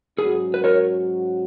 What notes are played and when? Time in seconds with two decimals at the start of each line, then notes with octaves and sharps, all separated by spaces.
0.18 G#2 F#3 C#4 F#4 G#4 B4
0.54 B4
0.64 A#4 C#5